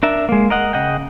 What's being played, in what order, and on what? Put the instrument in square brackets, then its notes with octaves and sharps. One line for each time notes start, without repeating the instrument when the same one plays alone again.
[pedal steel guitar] D4 A#4 E5
G#3 A#3
A#4 D#5 F#5
C#3 D#5 F#5 G5